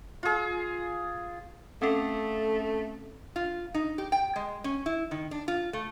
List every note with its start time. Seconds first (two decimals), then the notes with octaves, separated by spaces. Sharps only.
0.23 F4 G#4
1.82 A3 C4 C#4 A4
3.36 F4
3.74 D#4
3.98 G4
4.12 G5
4.36 G#3
4.64 C#4
4.86 E4
5.11 D#3
5.31 D4
5.48 F4
5.73 A3